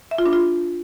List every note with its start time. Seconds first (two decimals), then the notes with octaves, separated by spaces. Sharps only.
0.11 E5
0.18 F4
0.26 D4
0.33 F4